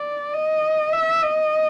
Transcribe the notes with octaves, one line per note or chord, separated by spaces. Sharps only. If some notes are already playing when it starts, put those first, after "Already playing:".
Already playing: D5
D#5
E5
D#5